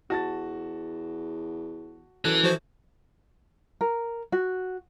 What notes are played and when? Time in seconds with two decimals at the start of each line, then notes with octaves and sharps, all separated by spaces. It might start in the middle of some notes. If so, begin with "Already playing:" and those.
0.10 E2 F#4 A5 A6
2.25 F#2 E3 A4 F#6
2.44 F3 F#4 C5
3.81 A#4
4.32 F#4